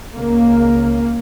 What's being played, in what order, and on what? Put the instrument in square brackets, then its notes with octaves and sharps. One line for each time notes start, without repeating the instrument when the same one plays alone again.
[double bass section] C#2 C#3 A#3